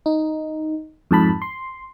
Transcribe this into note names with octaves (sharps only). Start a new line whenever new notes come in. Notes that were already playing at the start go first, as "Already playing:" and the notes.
D#4
F2 G#2 A5 B5
C6